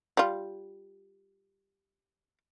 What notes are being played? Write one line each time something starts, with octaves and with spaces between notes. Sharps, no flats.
G3 F4